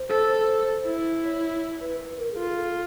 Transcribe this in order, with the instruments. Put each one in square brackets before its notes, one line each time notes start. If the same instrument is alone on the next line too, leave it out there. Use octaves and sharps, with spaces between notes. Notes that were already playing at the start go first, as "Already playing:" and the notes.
Already playing: [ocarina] C5
[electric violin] A4
E4
[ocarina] C#5
B4
B4
A#4
G#4
[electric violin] F4 [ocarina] A4
[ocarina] G#4
A4
A4